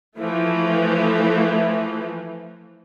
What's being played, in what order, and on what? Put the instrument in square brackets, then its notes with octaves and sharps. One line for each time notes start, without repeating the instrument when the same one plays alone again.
[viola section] E3 F3 A3